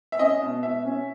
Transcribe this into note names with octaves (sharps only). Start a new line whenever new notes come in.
E5
C#4 D#5
B2
B2 E5
C#4